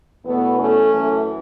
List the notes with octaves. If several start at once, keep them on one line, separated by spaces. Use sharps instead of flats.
E2 B2 A3 B3
A3 C#4
F#2 E3 A3